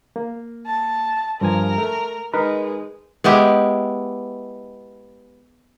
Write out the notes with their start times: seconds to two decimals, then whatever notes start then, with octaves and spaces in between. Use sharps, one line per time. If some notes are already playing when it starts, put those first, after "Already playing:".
0.16 A#3
0.67 A5
1.41 G2 F3 A#4 G#5
1.78 A3
2.34 G#3 D#4 A#4 B4
3.24 G#3 B3 E4 G4